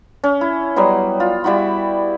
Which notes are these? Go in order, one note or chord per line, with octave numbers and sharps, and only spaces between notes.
C#4
E4
F#3 G3 B3 C6
F4
G3 E4 F#4 B5